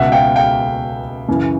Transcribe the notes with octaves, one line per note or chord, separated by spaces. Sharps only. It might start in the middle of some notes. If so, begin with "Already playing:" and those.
Already playing: C#2 B2 E5 F#5
F5 G5
F5 G5
F#2 C#3 E3